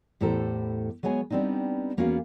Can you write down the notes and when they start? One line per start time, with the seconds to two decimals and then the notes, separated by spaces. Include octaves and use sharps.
0.21 E2 A2 G4 A4 C5 A#5
1.03 F#3 G#3 B3 C#5 G#5
1.30 G3 B3 C4 D4 D#4
1.97 E2 A#3 B3 C#4 F#4 F5